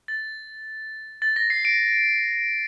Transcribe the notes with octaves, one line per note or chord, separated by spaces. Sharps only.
A6
A6
A#6
C7
D7